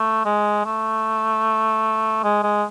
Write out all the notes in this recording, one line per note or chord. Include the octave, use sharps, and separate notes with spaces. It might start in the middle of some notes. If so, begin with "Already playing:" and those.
Already playing: A3
G#3
A3
G#3
G#3